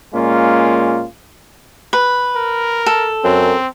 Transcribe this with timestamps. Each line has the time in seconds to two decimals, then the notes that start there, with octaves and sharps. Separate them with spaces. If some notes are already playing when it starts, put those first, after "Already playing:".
0.13 A#2 G#3 A#3 C#4 F4
1.93 B4
2.36 A#4
2.86 A4
3.24 F#2 C4